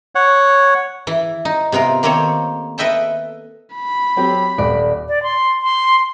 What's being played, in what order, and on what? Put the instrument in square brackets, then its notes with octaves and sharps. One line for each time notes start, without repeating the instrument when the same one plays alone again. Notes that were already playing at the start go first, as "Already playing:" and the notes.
[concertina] C#5 F#5
[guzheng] E3 E4
D#4
C3 B3 F4 A#4
D#3 A#3 C4 A4 C#5
A4 B4 D#5 E5 G5 A5
[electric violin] B5
[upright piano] F#3 C4 G4
[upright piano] D#1 [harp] D5
[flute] D5
C6
C6